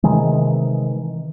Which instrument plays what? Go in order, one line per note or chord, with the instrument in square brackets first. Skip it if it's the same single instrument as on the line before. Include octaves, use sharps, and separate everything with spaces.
[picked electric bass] C3 D#3 E3 G#3